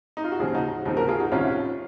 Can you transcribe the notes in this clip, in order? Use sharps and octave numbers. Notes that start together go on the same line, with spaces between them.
D#4
F4
F#4
D#2 C#3 F3 F4 G#4
D#4 F#4
D#2 C#3 F3 C4 D#4
F#4 A#4
F4 G#4
D#4 F#4
C2 C3 D#3 C#4 F4